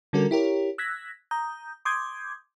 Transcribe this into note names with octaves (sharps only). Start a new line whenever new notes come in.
D3 G3 C#4 F#4 A4 A#4
E4 G4 A#4 C#5
E6 F#6 G#6 A#6 B6
A#5 D#6 G6
C6 D6 D#6 G6 G#6